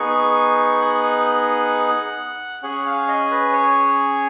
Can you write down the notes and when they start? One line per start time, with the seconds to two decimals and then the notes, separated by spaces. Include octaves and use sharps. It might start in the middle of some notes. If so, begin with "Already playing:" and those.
Already playing: B3 D#4 G#4 C#6
0.77 G#5
0.80 F#5
2.62 C#4 G#4 F#5
2.86 F5
3.08 D#5
3.31 B4
3.53 C#5